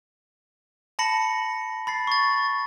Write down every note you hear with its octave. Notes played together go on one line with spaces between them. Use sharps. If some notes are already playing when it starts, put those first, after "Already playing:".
A5 B5 A#6 C#7 F#7
B5 A6 C7
C#6 A6